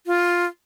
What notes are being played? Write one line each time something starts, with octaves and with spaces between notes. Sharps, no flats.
F4